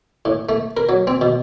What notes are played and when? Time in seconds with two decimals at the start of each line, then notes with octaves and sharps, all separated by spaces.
0.25 A2
0.49 A3
0.77 A#4
0.89 F#3
1.07 C4
1.21 B2